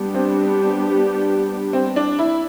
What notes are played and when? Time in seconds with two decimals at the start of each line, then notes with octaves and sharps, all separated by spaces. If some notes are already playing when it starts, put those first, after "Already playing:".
Already playing: G3 B3 D4 G4
0.14 C4
1.73 C4
1.96 D4
2.19 E4